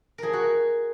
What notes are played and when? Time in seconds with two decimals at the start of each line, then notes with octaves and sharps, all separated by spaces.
0.18 F3 G#4 A#4
0.33 F#4